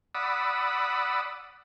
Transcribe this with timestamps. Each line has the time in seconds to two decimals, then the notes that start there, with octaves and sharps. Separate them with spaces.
0.15 D5 F#5 B5 D#6 E6